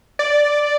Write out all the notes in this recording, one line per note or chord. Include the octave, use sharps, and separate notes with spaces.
D5